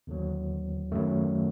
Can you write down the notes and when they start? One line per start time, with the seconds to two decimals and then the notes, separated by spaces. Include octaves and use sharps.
0.07 D#2 D3 F#3
0.92 F#2 D#3 F#3 A3